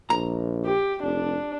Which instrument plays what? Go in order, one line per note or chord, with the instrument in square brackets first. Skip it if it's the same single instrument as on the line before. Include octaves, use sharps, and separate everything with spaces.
[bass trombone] A#1 [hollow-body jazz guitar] A#5
[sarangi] G4
[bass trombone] F1 [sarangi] D4